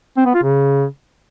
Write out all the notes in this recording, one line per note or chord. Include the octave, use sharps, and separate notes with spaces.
C4
B3
F4
C#3